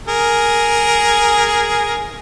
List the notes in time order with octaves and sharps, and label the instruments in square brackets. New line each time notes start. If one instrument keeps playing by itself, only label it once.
[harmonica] G#4 A#4